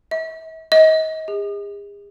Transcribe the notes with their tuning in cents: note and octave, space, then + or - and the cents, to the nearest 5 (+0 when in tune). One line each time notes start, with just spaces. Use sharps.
E5 -40
D#5 +30
G#4 -40